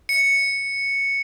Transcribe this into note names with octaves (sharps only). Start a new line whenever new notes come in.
C#7